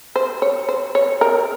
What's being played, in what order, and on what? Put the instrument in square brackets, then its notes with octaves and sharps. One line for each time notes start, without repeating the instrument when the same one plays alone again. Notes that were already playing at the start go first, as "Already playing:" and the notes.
[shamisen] C5
C#5
C5
C#5
A#4